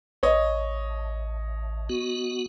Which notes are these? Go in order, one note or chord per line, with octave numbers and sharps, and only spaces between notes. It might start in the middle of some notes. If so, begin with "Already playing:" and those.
A1 C#5 D#5
B3 F#4